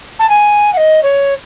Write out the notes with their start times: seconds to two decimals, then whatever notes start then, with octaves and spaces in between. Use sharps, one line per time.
0.19 A5
0.29 G#5
0.72 F#5
0.77 D#5
1.02 C#5